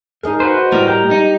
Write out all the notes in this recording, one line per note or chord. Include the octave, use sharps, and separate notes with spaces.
D#4 G#4 A#4 D#5 F5
F#4 B4 C5
D#5
A2 G3 A#4
G4 A#5
D#4